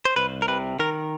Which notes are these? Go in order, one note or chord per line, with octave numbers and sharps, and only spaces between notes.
C5
C2 B4
A#4
C3 B4
D#3 A#4